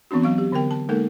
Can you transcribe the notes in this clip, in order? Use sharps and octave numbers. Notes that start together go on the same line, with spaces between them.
E3 B3 C4 D4 F#4
F#3 F5 C#6
G4
D3 B3 A#4 G5
A5
G#3 A#3 D#4 A4 A#4